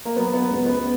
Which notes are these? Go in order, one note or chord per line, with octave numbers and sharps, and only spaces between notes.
A#3
F#3 B3
B3
C#2
B3